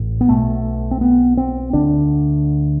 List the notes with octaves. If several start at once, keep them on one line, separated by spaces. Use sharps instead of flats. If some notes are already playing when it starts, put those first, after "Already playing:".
Already playing: A1 A2
B3
B1 B2 A3
C4
B3
C4
D2 D3 D4